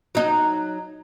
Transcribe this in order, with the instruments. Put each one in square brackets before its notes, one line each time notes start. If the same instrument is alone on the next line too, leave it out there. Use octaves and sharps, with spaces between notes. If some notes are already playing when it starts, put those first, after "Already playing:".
[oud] F#3 D#4